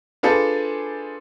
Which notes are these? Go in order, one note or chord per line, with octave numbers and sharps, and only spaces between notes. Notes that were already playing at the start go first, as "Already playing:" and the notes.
D4 F4 G#4 A4 B4 C5